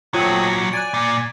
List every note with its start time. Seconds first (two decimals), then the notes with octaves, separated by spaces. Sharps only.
0.14 A#2 F#3 A3 C4 F4 C#5 D#6
0.51 F#5
0.73 D5 G#5 F#6 D7
0.94 A#2